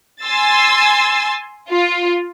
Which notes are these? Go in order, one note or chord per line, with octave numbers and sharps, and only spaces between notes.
G#5 C6 E6 A6
F4